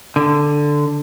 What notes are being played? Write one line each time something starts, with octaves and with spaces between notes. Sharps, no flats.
D3